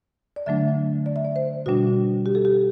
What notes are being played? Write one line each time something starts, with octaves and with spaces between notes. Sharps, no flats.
D5
D3 F#3 A3 D4 E5
D5
E5
D5
C5
B2 G3 D4 F#4
G4
A4
G4